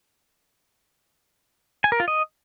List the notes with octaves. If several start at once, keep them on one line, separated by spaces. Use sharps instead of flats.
G#5
A#4
F4
D#5